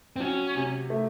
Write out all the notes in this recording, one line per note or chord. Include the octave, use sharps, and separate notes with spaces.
C4
F#3 C#4
C3
A3